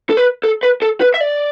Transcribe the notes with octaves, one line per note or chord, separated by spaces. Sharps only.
A4
B4
A4
B4
A4
B4
E5
D5